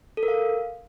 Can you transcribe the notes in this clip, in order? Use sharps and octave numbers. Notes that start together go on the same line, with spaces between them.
A4
A#4
F5